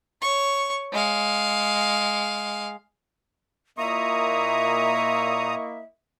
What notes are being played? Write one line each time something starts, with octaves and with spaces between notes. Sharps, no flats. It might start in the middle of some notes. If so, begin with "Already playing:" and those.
C#5 C#6
G#3 F5
A#2 A#3 E4 D#5 E5 A#5 C#6 D#6